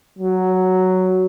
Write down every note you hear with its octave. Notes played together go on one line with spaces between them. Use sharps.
F#3